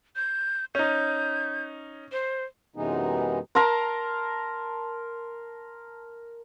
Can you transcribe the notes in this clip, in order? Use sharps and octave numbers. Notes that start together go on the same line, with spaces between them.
G6
C#4 D#4 G6
C5
F#2 C3 E3 G#3 B3 D#4
A#4 A5 A#5 C6